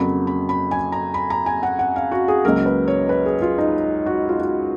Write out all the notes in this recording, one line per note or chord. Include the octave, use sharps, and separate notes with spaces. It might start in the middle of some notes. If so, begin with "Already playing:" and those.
Already playing: F2 C#3 F#3 A#3 B5
B5
B5
G#5
A#5
B5
A#5
G#5
F#5
F#5
F5
F#4
G#4
C#2 C#3 F#3 A#3 A#4
B4
C#5
B4
G#4
F4
D#4
F#4
F4
F#4